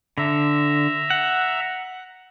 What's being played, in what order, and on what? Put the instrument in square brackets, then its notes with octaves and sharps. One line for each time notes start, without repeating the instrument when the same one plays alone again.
[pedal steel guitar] D3 [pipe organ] E5 A#5
[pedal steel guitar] F#5